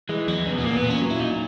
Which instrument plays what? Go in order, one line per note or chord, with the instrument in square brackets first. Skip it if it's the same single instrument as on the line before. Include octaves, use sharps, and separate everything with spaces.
[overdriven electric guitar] E3 [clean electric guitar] G#3
[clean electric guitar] E2 [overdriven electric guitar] F#3
[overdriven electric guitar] E3
[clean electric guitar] E2 [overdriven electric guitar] C#3
[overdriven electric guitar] B2
B3
[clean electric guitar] A#2 [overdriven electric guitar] A#3
[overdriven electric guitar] B3
[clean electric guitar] A#2
[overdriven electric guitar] C#4
[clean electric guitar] F#3
[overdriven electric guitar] E4
[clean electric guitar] A#2 [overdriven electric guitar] D#4